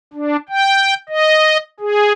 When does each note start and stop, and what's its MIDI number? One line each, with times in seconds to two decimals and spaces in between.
0.13 0.36 62
0.49 0.94 79
1.09 1.57 75
1.80 2.13 68